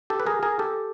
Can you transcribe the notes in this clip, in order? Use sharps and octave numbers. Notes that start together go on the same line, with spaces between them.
G4 A4
B4
G#4 A#4
G#4 A#4
G4 A4